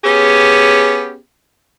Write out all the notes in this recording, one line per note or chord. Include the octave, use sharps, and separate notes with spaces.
B3 C#4 G4 G#4